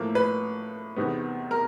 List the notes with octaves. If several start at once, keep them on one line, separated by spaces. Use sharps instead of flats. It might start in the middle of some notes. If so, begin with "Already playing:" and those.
Already playing: A2 F3 A#3
B4
E2 C3 D#3 G#3 B3
A#4